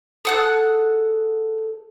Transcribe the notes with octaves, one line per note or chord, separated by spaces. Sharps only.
G#4 A4 F#5 F#6